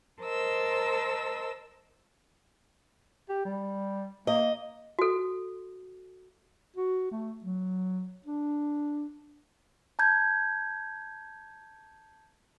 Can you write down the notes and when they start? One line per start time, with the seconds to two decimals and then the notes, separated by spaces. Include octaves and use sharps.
0.23 A#4 C5 D#5 A5 E6
3.29 G4
3.45 G3
4.27 A#3 D#5
4.99 F#4 A4
6.77 F#4
7.11 A3
7.44 F#3
8.26 D4
9.99 A5 A#5 G6 G#6